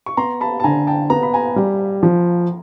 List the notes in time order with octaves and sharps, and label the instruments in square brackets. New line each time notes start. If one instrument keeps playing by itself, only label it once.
[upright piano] C#6
[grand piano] B3 [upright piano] A#5 C6
[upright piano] A5 B5
A5
[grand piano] D3 [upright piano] G#5 A#5
[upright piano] G5 A5
[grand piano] B3 [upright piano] A#5
[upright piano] B5
G#5 A#5
[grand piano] G3
F3